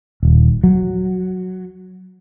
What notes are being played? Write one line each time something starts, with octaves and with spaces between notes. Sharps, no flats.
D#1
F#3